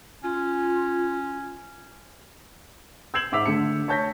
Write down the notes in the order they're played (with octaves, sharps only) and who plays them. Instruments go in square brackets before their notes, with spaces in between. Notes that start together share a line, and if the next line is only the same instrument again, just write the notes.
[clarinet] C#4 [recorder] F4
[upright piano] E6 G6 G#6 C7 E7 F#7
G#2 E5 D6 E6 B6 F7
D3 A3 C#7
C#5 A5 G6 A#6 B6